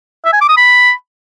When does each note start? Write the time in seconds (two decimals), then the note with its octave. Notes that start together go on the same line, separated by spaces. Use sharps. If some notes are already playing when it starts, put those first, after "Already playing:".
0.25 E5
0.33 G#5
0.41 D6
0.49 D#6
0.57 B5